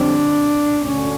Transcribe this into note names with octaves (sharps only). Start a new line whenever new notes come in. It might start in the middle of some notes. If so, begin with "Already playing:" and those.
Already playing: F2 D3 G3 C4 D4
D2 D3 C#4